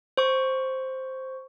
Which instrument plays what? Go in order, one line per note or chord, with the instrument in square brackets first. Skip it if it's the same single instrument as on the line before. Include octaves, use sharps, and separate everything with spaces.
[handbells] C5 C#6